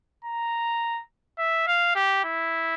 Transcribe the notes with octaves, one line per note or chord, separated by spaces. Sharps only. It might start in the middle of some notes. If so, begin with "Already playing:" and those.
A#5
E5
F5
G4
E4